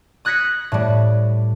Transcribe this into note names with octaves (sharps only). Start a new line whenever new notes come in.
D#6 F#6 G#6 A#6 B6 C#7
A2 G3